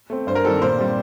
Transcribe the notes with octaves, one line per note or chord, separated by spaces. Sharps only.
A3 C4
G2 C5
A#4
D#3 G3 C4 A4
A#2 C5
G3 C4